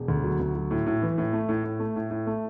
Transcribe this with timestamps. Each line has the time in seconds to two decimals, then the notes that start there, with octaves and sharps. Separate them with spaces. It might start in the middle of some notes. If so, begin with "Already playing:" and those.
Already playing: E1
0.08 D2
0.24 F#3
0.40 D2
0.55 F#3
0.71 A2
0.87 A2
1.02 E3
1.18 A2
1.33 A3
1.49 A2
1.64 A2
1.80 A3
1.96 A2
2.11 A2
2.27 A3